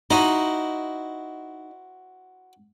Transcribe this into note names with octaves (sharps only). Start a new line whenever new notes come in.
D#4 E4 F#4 C5